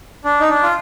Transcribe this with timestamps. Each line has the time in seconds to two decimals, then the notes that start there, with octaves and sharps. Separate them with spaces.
0.24 D4
0.40 D#4
0.49 D4
0.63 F4